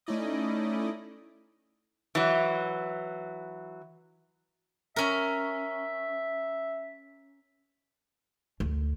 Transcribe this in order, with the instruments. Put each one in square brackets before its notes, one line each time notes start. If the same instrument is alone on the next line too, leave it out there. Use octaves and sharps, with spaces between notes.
[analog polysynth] A3 C#4 D#4 E4 D5 D#5
[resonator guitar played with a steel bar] E3 F#3
[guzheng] C#4 A#4 [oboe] E5
[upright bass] D2